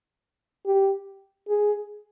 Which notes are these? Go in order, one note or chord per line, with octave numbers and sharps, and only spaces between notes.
G4
G#4